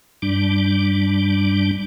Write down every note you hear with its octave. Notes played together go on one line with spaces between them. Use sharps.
G2 G3 D4